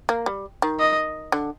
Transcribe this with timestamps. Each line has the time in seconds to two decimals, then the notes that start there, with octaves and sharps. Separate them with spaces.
0.09 A#3
0.26 G3
0.62 D#3
0.79 D#5
1.32 D3